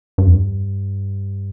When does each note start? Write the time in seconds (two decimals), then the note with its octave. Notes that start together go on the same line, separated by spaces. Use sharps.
0.18 G2
0.27 F2
0.34 G2